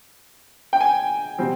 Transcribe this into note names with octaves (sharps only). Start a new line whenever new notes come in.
G5
G#5
B2 G3 C4